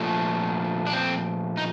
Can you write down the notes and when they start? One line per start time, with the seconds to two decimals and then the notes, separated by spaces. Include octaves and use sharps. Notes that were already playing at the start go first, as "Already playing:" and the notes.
Already playing: A#2 F3 A3
0.87 D4
0.93 C4
1.57 D#4